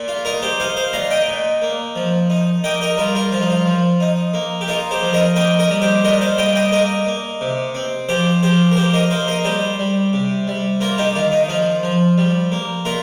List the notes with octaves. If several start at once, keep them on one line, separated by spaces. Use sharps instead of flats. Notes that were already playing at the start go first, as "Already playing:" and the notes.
Already playing: A#2 A#3
F4
D#4 F4 A#4
G4 C5
D#4 C5 F5
C5 F5
A#2 F5 A#5
D#5 G5
A#2
A#3
F3
D#4
A#3 D#5 G5
A#4 D#5
G3 F4 A#4
F4 A#4
F3 F4
D#4
F4
F3
D#4
A#3
G4
D#4 F4 A#4
G4 C5
F3
A#4 D#5
A#3 D#5 G5
A#4 D#5
G3
G4 C5
A#2 A#4 D#5
C5 F5
G3 D#5 G5
D#5 G5
A#3 A#4 D#5
A#3
C3
C4
F3 G4 C5
F3 G4 C5
A#4
A#3 G4 C5
A#4 D#5
A#3 C5 F5
A#4 D#5
G3 G4 C5
G3
C3
G3
A#3 F4 A#4
D#4 G4
D#3 F4
D#4
F3 F4
F3
G3
A#3
A#2 F4 A#4